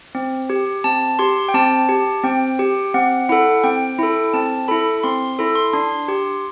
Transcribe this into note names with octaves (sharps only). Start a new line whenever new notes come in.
C4
G4
C4 A5
G4 C6
G5
C4 A5
G4
C4 G5
G4
C4 F#5
E4 A4 F#5
C4 G5
E4 A4
C4 A5
E4 A4 B5
C4 C6
E4 A4
C6
D4 C6
G4